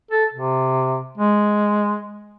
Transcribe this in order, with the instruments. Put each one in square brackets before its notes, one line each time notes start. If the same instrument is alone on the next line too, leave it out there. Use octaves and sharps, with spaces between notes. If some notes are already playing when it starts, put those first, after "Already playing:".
[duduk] A4
C3
G#3